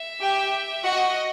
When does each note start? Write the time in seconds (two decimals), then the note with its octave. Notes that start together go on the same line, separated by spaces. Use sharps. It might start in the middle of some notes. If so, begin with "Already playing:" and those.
Already playing: E5
0.21 G4 G5
0.84 F#4 D#5 F#5